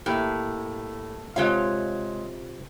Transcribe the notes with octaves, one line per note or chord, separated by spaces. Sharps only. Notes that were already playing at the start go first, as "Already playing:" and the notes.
A2 A#3 G4
C3 G#3 F4 C#5 F5